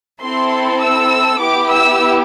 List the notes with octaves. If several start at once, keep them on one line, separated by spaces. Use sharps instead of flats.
C4 E4 A4 C6
E6
B3 E4 G4 D6
E6